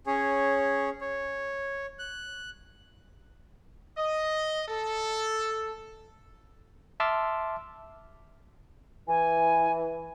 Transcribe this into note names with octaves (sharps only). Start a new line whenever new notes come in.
C#4 G#4 C#5
C#5
F#6
D#5
A4
E5 A5 C6 D6 E6 F6
E3 G#5